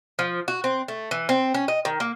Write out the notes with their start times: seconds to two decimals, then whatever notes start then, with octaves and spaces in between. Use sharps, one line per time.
0.19 F3
0.48 F#4
0.64 C4
0.88 A3
1.11 E3
1.29 C4
1.54 C#4
1.68 D#5
1.85 D#3
2.00 A#3